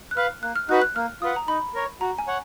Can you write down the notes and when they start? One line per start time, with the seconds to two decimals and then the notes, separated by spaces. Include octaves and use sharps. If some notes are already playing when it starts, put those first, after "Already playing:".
0.11 F#6
0.16 B4 F5 F6
0.42 A#3 F#6
0.56 F6
0.69 D#4 F#4 B4 F#6
0.82 F#6
0.96 A#3 F6
1.22 F4 B4 F#5 D#6
1.36 A#5
1.48 D#4 B5
1.74 A#4 C#5
2.01 F#4 A#5
2.18 G#5
2.27 C#5 F#5